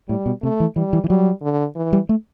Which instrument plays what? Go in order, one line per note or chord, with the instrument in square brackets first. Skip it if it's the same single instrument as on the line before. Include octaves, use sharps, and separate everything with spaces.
[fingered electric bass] A2 [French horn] G3
[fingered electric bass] B2
[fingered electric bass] C3 [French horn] A3
[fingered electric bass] E3
[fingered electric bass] E3 [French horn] G3
[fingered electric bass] E3
E3
[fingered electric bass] F#3 [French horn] G3
[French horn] D3
E3
[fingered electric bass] G3
A3